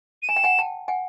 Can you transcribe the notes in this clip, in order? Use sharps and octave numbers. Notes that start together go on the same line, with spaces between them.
D#7
G#5 E7
G5
F#5 G#5
G5 A5
F#5 G#5